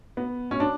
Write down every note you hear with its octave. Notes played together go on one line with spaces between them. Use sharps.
B3
C#4
D4